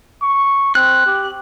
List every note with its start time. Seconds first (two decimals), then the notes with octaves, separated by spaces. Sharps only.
0.21 C#6
0.75 C4 F#6
1.06 G4